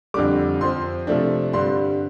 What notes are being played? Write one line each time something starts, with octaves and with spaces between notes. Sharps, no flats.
F2 D3 G3 D6
F2 F3 C4 C6
C3 F3 A3 D4
G2 D3 G3 C4 C6